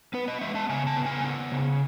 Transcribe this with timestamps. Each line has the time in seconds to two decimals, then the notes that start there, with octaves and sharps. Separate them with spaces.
0.14 B3 B4
0.28 D#5
0.41 G#3 E5
0.55 A5
0.69 C#3 G#5
0.87 A5
0.97 B3
1.06 G#5
1.24 B3
1.52 C#3